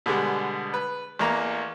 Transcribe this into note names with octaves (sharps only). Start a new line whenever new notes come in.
B2 D3 G3 G#3 B3
B4
A1 E2 A#3 A#5